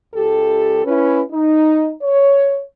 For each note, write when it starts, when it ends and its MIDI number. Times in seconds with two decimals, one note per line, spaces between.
0.14 0.81 37
0.14 0.81 67
0.14 0.81 69
0.85 1.22 61
0.85 1.22 64
0.85 1.22 71
1.31 1.93 63
2.02 2.62 73